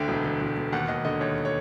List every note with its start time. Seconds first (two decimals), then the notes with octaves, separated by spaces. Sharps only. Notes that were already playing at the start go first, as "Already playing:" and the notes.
Already playing: D2 D3 G5
0.08 E1
0.24 D3
0.41 E1
0.57 E1
0.72 D#2 F#5
0.88 D#2 D#5
1.05 D3 D#5
1.20 D#2 C#5
1.45 C#5